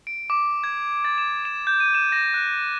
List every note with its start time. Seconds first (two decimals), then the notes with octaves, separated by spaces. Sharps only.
0.07 D7
0.30 D6
0.64 G#6
1.05 A6
1.18 E7
1.45 E7
1.67 G6
1.80 D#7
1.94 E7
2.12 A#6
2.34 F#6